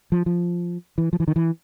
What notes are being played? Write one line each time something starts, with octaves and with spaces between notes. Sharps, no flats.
F3
F3
E3
F3
E3
D#3
E3